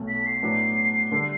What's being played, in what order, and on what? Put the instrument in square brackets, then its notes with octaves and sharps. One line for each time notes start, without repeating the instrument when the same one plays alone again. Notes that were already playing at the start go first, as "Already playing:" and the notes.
Already playing: [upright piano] B1 B2 A3
[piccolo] B6
C7
[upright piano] A2 F#3 B3 D4
D3 G3 D4 A4